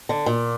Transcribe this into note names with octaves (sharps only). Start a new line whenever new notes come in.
D3
A#2